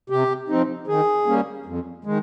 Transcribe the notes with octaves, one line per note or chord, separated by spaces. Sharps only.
C3 G4
F3 C4 D#4
D#3 G#4
G3 A#3 C#4
F2
D#3 G#3